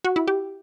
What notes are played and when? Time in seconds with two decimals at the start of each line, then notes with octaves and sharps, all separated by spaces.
0.04 F#4
0.16 E4
0.28 G4